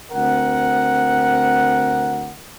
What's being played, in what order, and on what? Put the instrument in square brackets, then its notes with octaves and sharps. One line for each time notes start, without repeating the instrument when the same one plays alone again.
[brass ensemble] D2 C4 A#4 F#5